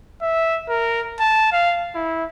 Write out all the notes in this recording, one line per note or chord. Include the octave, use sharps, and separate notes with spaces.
E5
A#4
A5
F5
E4